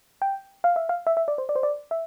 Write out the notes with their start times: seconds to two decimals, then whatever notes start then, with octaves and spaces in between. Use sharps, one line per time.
0.22 G5
0.64 F5
0.76 E5
0.89 F5
1.07 E5
1.17 E5
1.28 D5
1.38 C5
1.49 D5
1.56 C5
1.63 D5
1.91 E5